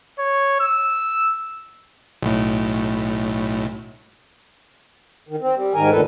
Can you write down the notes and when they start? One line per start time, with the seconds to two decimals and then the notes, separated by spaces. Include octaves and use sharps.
0.19 C#5
0.60 E6
2.22 B1 A2
5.29 D#3
5.41 C4
5.55 G3
5.74 G#2 D#3 A#4 G#5
5.91 D2 G2 A#2 D#3 A4 B4